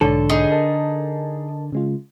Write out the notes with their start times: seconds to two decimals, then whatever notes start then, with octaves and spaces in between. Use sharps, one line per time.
0.01 B1 G#2 D3 A4 C#5
0.30 D#4 G#4
0.52 A#4 D#5 A5
1.72 C#3 G#3 F4